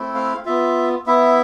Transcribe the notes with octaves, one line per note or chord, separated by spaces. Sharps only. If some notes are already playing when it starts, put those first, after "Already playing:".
Already playing: A3 C4 E4
F5
B3 F4 E5
B3 E4 E5